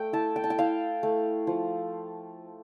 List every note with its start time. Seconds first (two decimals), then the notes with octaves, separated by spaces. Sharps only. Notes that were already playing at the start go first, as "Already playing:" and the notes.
Already playing: A3 G5
0.13 E4 A5
0.36 G5
0.44 A5
0.50 G5
0.58 E4 F5
1.03 A3
1.47 F3